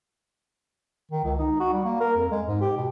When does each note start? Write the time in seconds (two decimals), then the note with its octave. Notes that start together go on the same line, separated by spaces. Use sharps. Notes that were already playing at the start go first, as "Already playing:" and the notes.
1.12 D#3
1.24 C#2
1.39 D#4
1.60 F#4
1.73 G3
1.85 A#3
2.01 A#4
2.17 F2
2.31 G#3
2.47 G#2
2.61 G4
2.77 B2